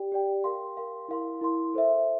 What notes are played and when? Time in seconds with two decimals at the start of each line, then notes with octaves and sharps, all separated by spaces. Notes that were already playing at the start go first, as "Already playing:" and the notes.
Already playing: G4 D5 G5
0.12 G4 D5 G5
0.44 A#4 F5 C6
0.77 A#4 F5 C6
1.08 E4 A#4 F5 C6
1.41 E4 A#4 F5 C6
1.74 A4 C5 E5